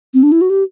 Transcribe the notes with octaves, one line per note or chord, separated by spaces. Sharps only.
C4
D4
E4
F#4
G4